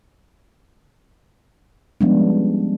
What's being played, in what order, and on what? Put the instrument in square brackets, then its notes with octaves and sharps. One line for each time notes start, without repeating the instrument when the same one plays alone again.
[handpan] F3 G3 G#3 B3 C#4 D4